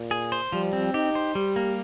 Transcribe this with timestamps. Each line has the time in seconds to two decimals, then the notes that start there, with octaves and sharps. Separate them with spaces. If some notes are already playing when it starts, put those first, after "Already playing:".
Already playing: A#2
0.11 G#4
0.32 C5
0.52 F3 G3
0.73 C4
0.94 D#4 G4
1.15 C5
1.35 G3 G4
1.56 A#3